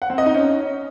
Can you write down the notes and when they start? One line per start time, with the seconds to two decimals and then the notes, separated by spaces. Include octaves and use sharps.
0.02 F#5
0.10 C4
0.18 D#5
0.26 D#4
0.34 C#4